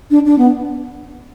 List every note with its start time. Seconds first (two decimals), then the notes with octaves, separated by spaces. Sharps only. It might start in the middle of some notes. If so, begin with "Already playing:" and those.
0.11 D4
0.26 D4
0.38 B3